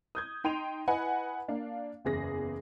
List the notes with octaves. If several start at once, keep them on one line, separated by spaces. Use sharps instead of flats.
D#6 G6 G#6
D#4 G5 C6 D#7 F7
E4 B4 D#5 F#5 G#5 B5
A#3 D4 F5
F#1 E2 G#4 A#6